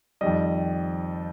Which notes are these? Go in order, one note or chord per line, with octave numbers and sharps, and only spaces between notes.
F2 D#3 G3 D#5